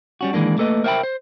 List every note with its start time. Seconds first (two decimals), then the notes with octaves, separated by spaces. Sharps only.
0.21 G3 C#4 F#4
0.33 D#3 E3 G#3 A#3 D4
0.58 A3 A#3 A4 B4 D#5
0.84 A#4 C5 E5 F5 G5 B5
1.03 C5